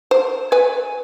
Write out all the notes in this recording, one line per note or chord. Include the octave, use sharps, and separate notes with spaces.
C5
B4 G#5